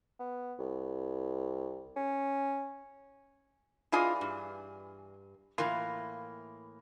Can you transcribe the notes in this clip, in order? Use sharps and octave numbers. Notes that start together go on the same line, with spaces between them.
B3
C2
C#4
E3 D4 F4 G#4 D5 D#5
G2
A2 E3 A#3 F4